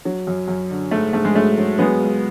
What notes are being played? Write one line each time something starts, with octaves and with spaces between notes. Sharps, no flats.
F#3
F#2
F#2
D3
G#2 A3
G#2 A3
G#3
F#3 A3
F#3
F#3 G#3 B3
C#2